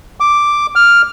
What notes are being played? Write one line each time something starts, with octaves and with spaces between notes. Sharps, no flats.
D6
F6